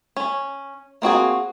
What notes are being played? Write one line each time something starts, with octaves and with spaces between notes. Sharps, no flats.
C#4
A#3 C4 F#4 G#4